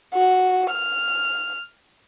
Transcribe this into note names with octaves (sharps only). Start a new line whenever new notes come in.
F#4
F6